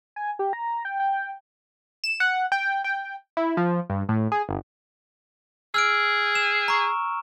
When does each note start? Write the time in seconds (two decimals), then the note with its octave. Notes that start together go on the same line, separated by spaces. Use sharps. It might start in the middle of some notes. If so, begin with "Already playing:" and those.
0.16 G#5
0.39 G4
0.53 A#5
0.85 G5
1.00 G5
2.04 E7
2.20 F#5
2.52 G5
2.84 G5
3.37 E4
3.57 F3
3.90 G2
4.09 A2
4.32 G#4
4.49 G1
5.74 G#4 E6 F6 D7
6.35 E7
6.68 A#5 C#6